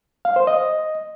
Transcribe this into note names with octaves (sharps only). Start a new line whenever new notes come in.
F5
C5
D#5